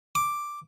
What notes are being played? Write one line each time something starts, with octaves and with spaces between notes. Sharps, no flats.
D6